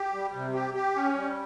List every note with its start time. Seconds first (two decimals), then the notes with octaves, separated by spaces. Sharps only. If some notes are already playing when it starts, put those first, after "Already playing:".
Already playing: G4
0.14 G3
0.34 C3
0.54 G4
0.74 G4
0.95 C#4
1.15 G3